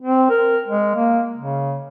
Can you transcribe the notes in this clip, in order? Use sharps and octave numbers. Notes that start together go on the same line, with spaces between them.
C4
A#4
G#3
A#3
C#3